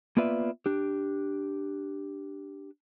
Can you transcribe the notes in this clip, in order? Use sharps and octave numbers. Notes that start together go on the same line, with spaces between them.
A#3 B3 F4 B4 D5 E5
D4 G4